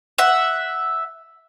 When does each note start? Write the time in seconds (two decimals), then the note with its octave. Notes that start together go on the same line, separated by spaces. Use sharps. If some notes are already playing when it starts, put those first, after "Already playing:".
0.18 E5 F#5